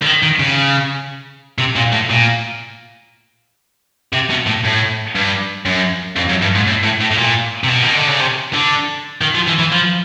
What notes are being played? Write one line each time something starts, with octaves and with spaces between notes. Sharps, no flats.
D3
D#3
D#3
C#3
C3
A#2
A2
A#2
C3
B2
A2
A2
G2
F#2
F2
F#2
G2
G#2
A2
A2
A2
A2
A#2
C3
B2
D#3
D3
C#3
C3
D3
D#3
F3
E3
E3
F3